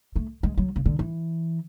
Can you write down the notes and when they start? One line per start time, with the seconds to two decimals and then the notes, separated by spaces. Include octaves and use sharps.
0.16 A3
0.43 G#3
0.57 F#3
0.76 C#3
0.86 D3
0.99 E3